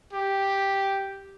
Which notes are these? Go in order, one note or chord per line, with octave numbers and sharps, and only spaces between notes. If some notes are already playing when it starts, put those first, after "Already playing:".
G4